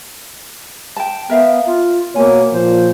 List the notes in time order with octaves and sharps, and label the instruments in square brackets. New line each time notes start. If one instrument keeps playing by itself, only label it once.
[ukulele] G5 A5
[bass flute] B3 [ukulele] A#4 E5 F5
[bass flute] F4
[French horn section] B2 C#5 [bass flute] A#3 [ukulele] G#5
[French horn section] A#2 F3 [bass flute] C5